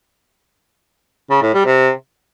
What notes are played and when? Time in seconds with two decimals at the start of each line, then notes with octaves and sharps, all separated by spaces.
1.30 C#3
1.42 A2
1.54 G3
1.66 C3